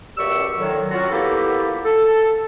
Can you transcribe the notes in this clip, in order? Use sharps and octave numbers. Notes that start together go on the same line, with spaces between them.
C#2 F#2 G4 D5 C#6 E6
A2 D3 D#3 F#3
F#3 C#4 F4 F#4
A#3 B3 E4 F4 G4 A4
A4